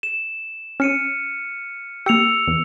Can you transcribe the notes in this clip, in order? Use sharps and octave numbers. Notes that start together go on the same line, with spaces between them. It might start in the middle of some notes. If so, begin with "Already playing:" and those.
E7
C#4 F6 C#7 D#7
A#3 G4 E6 C#7 F7
E2